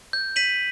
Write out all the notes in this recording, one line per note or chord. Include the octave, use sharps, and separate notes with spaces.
G6
B6 D#7 F#7